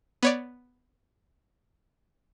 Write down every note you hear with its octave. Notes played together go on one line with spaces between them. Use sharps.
B3 C#5 D5